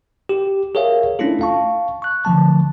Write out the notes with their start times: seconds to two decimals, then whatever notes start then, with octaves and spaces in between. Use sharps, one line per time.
0.29 G4
0.75 G#4 A#4 C#5 E5 F5
1.19 A3 C#4 D4 E4 F4 A4
1.41 F5 A5 C#6
2.02 C#6 F#6
2.25 D3 F3 A3 A5